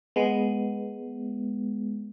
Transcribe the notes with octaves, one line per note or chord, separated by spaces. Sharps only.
G#3 B3